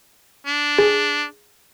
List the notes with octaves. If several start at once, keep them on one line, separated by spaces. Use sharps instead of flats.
D4
G#4